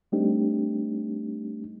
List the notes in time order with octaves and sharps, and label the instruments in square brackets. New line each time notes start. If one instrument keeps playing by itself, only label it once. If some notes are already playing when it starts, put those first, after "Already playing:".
[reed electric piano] G3 A3 C4 D4 D#4 G4